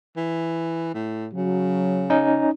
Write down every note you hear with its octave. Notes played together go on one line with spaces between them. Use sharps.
E3
A2
C#3 F#3
C#4 D#4